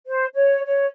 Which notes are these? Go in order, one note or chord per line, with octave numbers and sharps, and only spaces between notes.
C5
C#5
C#5